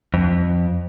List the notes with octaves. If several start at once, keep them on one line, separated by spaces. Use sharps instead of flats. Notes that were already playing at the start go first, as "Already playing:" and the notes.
F2